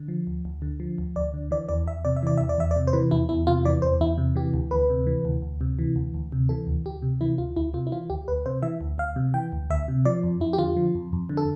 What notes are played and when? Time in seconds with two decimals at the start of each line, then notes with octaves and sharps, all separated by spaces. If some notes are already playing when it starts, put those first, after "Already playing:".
Already playing: D3
0.08 F3
0.27 D2
0.45 D2
0.62 D3
0.80 F3
0.98 D2
1.16 D2 D5
1.34 D3
1.51 E3 D5
1.69 E2 D5
1.86 E2 E5
2.05 C3 D5
2.16 E5
2.23 E3 D5
2.37 E2 E5
2.49 D5
2.58 E2 E5
2.71 D5
2.76 C3
2.87 C5
2.93 E3 B4
3.11 E2 E4
3.29 E2 E4
3.47 C3 F4
3.65 E3 D5
3.82 E2 C5
4.01 E2 E4
4.18 C3
4.35 E3 G4
4.54 D2
4.71 D2 B4
4.90 C3
5.07 E3
5.25 D2
5.42 D2
5.61 C3
5.79 E3
5.96 D2
6.14 D2
6.32 C3
6.49 E3 A4
6.67 D2
6.85 D2 G4
7.02 C3
7.21 E3 E4
7.38 D2 F4
7.56 D2 E4
7.74 C3 F4
7.87 E4
7.92 E3 F4
8.10 D2 G4
8.28 D2 B4
8.46 C3 C5
8.63 E3 E5
8.81 D2
8.98 D2 F5
9.16 C3
9.34 E3 G5
9.52 D2
9.70 D2 E5
9.88 C3
10.05 F3 D5
10.23 F2
10.40 F2 E4
10.53 G4
10.58 D3 F4
10.76 F3
10.95 F2
11.13 F2
11.29 D3
11.37 A4